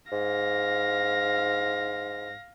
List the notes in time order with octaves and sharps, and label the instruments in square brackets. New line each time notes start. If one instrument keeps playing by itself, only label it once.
[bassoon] G#2 [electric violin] F5 A#6